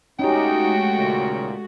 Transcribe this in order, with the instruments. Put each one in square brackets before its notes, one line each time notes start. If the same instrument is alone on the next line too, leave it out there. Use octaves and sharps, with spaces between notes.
[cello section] G#3 A3 F#4 [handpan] C#4 G4 [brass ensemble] D#4 [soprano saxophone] G5
[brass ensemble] D#2 A#2 C#3